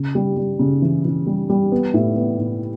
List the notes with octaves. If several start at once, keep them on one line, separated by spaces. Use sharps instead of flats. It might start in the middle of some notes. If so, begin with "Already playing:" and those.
Already playing: C#3
G3
G3
C#3
E3
E3
G3
G3
B3
A2
B3
A2